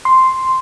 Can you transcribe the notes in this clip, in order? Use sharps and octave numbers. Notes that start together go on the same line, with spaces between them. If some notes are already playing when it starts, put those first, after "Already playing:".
C6